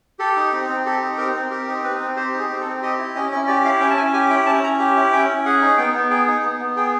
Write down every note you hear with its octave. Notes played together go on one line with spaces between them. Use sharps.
G4 A4
D#4
C4
C4
G4 A4
D#4
C4 A#4
C4
G4 A#4
D#4
C4 B4
C4
G4 C5
D#4 G#4
C4
A4
C4
G4 D#5
E4
C#4 D#5
C#4
G4 D5
E4 F5
C#4 G5
A5
C#4 G#5
G4 G#5
E4 G5
C#4 A5
C#4 A#5
G4
E4
C#4 G5
C#4
G#4 F#5
D#4
B3 G5
B3
G#4 G5
D#4
B3
B3
G#4 G5